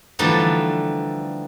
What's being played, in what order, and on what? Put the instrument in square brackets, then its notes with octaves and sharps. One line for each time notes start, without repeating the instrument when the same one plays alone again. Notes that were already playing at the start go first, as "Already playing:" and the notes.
[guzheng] D3 E3 F3 G3 A3 D#4